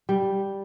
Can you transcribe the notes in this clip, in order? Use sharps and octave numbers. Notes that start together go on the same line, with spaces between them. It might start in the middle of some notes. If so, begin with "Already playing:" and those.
G3